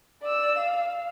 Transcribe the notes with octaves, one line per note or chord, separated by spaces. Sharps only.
D5 E6
F5